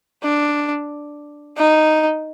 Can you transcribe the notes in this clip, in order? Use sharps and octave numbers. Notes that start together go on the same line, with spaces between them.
D4
D#4